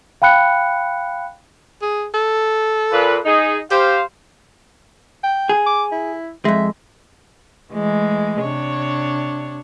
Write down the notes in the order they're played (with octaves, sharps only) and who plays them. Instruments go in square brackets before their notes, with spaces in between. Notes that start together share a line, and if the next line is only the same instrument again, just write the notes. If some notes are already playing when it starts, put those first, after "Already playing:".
[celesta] F5 G5 B5 F#6 C#7
[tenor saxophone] G#4
A4
[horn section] A#2 B4
D#4 G#4
[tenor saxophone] G4 [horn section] C5 F5
[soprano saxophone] G5
[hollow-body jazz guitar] G#4
[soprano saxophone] D6
E4
[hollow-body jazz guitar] F2 G#3 [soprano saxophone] E5
[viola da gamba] E3 G#3 A3
C3 D4 C#5